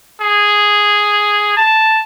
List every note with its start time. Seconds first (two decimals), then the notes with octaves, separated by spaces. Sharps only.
0.21 G#4
1.57 A5